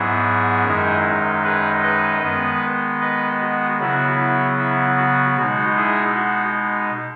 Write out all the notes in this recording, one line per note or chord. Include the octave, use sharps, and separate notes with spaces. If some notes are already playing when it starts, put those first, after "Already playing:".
Already playing: G#2 F#3 B3 E4 G#4
F#2 D#3 G#3 D#4
G#4 B4
B4 D#5
D#3 G#3 B3
B4 D#5
F#4
C#3 F#3 B3 E4 F#4
E4
E4
F#4
B2 G#3 D#4 F#4
E4 G#4
F#4